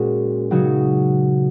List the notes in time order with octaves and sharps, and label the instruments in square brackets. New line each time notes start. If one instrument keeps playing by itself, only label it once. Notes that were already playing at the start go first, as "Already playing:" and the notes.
Already playing: [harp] A#2 G#3 C#4 F#4
C#3 F#3 D#4 F#4